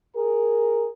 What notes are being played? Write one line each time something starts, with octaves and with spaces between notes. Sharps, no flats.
G#4 A#4